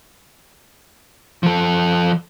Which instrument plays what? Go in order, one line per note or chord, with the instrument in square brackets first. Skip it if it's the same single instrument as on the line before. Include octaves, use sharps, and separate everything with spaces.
[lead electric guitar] F3 A4